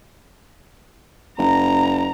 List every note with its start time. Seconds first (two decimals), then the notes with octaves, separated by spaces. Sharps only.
1.38 F#1 A#5